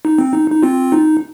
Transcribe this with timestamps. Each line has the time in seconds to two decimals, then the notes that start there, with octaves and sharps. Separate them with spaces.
0.05 D#4
0.19 C4
0.33 D#4
0.51 D#4
0.63 C4 F4
0.92 D#4